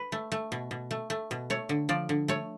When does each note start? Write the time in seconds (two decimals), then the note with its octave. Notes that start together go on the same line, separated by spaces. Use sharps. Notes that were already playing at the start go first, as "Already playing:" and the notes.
Already playing: B4
0.12 A3
0.32 A3
0.52 B2
0.71 B2
0.91 A3
1.10 A3
1.31 B2
1.50 A3 C#5
1.69 D3
1.89 F3 D5
2.09 D3
2.28 A3 C#5